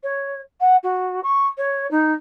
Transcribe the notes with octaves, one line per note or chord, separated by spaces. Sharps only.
C#5
F#5
F#4
C#6
C#5
D#4